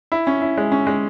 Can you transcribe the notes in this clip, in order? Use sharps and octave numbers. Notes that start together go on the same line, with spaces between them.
E4
C#4
E4
G#3
C#4
G#3